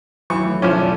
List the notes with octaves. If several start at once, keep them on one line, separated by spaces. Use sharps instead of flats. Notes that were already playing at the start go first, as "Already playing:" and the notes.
D#2 E3 F#3 E4 F#4 C#6
F#3 A3 E4
B1 E2 D#3 F3 C#4 C5 D6
A4 D5